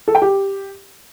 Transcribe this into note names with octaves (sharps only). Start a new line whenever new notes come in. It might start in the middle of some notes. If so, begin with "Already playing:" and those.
A4
G5
G4